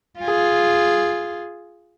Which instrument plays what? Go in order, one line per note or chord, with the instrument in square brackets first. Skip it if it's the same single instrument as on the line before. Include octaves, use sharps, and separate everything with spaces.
[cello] F4 G#4